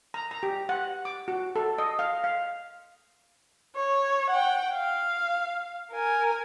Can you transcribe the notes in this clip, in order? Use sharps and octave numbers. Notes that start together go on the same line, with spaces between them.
A#5
A#5
G4
F#5
D6
F#4
A4
D#5
F5
F5
C#5
F#5 G5
F5
A#4 G#5